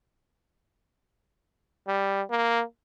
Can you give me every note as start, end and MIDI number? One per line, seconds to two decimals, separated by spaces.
1.87 2.22 55
2.31 2.63 58